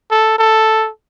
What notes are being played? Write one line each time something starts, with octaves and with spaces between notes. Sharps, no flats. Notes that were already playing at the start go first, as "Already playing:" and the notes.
A4
A4